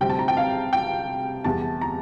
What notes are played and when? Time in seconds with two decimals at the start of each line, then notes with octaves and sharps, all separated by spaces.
0.01 D2 C3 G3 C4 G5
0.10 A5
0.19 A#5
0.28 G5
0.37 F5
0.73 G5
1.44 E2 C3 G3 A5
1.81 A#5